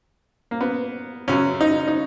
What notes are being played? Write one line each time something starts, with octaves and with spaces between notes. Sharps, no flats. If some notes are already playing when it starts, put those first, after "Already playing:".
A#3
B3
F#2 C#3 F#3 C#4
D#4
D#4